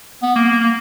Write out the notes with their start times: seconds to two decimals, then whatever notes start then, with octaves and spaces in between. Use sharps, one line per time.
0.22 B3
0.35 A#3
0.48 A#3
0.61 A#3